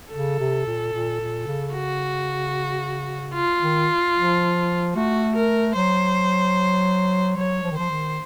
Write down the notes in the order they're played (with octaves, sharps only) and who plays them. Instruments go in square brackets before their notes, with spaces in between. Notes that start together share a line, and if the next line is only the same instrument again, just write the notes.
[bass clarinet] C#3 [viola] A4
[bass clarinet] C3
A#2
A#2
A#2
C#3
[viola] F#4
F4
[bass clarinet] D#3
F3
[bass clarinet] A3 [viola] F#4
[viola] A#4
[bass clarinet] F#3 [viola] C5
[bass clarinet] F#3 [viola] C#5
[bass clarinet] F3
D#3
[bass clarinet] F3 [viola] C5
[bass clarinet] D#3